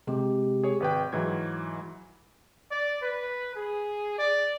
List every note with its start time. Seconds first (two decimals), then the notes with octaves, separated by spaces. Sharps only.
0.07 C3 G#3 G4
0.63 G#4 C#5
0.80 G#1 B4 G5
1.13 G#2 E3 F#3 G#6
2.71 D5
3.02 B4
3.55 G#4
4.18 D5